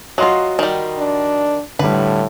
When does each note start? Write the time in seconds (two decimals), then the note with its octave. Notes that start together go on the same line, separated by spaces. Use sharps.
0.18 F#3 F4 F#4 D#5 C6
0.59 D#3 G3
0.99 D4
1.79 A2 D3 G3 B4